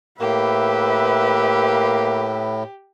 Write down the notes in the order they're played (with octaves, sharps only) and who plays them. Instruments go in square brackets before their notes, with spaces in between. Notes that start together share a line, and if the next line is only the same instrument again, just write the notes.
[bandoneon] A2 [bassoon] A#3 [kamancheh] G4 [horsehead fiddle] B4 E5